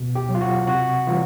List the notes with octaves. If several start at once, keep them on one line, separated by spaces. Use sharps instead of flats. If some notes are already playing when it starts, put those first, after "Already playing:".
Already playing: B2
G4
F#3
F4
F#4
C3 F#4
E3 G3 F4